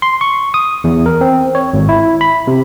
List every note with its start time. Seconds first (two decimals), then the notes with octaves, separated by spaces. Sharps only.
0.02 C6
0.21 C#6
0.54 D#6
0.84 E2
1.06 A#4
1.21 C4
1.55 C#5
1.74 G#1
1.89 E4
2.21 B5
2.47 C3